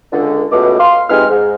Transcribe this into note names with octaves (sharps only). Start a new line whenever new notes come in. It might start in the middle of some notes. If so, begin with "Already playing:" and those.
C#2 D3
C#2 B2 A3 B3 D#5 D6
F5 C6
F2 C3 G#3 D#4 B4 F6
G#2